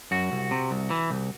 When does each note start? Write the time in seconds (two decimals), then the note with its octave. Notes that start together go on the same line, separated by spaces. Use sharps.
0.11 F#2 F#4
0.32 C2
0.51 C3
0.71 C2
0.90 E3
1.10 C2